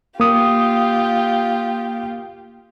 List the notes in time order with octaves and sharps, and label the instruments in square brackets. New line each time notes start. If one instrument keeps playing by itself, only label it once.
[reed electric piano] A#3 D#6 [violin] F4 G4